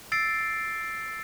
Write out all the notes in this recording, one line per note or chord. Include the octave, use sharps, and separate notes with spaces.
E6 A6 C7 D7